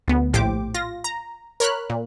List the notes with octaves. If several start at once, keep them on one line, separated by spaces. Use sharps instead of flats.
D2 B3
A#1 A2 G4 C5 D6
F4 A#6
A#5
A#4 C#5 B5 F6 F#6
A#2